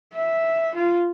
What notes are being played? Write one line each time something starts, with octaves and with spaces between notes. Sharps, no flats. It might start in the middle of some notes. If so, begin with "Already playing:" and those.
E5
F4